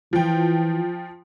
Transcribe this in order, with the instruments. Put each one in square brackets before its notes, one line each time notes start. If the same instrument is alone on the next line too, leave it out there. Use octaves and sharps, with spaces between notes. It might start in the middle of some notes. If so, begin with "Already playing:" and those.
[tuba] E3 [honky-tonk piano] F3 G5